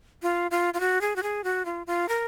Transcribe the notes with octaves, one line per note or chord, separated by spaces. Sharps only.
F4
F4
F4
F#4
G#4
F#4
G#4
F#4
F4
F4
A#4